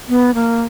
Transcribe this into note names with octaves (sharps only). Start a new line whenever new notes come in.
B3
A#3